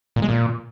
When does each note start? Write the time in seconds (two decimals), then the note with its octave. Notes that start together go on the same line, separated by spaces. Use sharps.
0.16 A#2
0.22 G#3
0.28 A#2